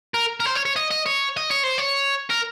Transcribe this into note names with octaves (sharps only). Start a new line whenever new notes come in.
A#4
A#4
C5
C#5
C#5
D#5
D#5
C#5
D#5
C#5
C5
C#5
A#4